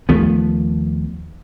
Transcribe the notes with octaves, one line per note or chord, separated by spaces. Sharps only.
D#2 F3 A3 B3